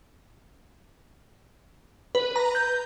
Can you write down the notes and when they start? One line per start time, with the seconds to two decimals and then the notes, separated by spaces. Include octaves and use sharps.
2.15 B4
2.36 A#5
2.55 G6